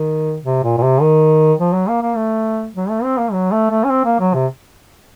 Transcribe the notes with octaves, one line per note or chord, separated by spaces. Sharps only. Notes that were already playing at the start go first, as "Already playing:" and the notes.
Already playing: D#3
C3
A#2
A#2
C3
D#3
F3
F#3
A#3
A#3
A3
F#3
A3
C4
A#3
F#3
A3
A3
C#4
C4
A#3
F#3
C3